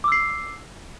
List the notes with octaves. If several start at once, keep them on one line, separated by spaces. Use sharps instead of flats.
D6 E6 C7